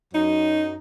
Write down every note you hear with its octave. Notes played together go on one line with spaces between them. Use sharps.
F#2 F#3 D#4